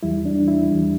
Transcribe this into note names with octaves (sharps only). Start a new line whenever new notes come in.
E2 E3 G3 E4
D4
E4
E2 E3 G3